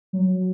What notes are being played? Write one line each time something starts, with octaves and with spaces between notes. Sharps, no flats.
F#3